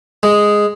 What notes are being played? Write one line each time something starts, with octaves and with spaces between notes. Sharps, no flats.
G#3